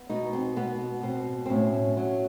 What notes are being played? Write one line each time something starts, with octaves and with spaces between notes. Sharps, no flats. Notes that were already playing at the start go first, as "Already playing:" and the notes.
Already playing: B3
B2 D#4
C4
B2 B3
B2 C4
C4
A2 C#4
F#3